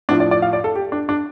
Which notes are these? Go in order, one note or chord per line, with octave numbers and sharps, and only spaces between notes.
A2 F3 D4
D5
D5
F5
D5
A4
G4
D4
D4